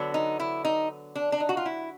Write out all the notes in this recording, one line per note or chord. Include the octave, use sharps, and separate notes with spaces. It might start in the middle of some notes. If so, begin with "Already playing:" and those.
Already playing: D3 F#3 B3
D#4
E4
D#4
D4
D4
D#4
F#4
F4
E4